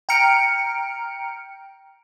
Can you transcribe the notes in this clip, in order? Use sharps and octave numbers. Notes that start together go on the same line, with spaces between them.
G5 A#5 F6 C#7 D7